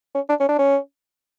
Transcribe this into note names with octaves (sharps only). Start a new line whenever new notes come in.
C#4
D4
C#4
D4
C#4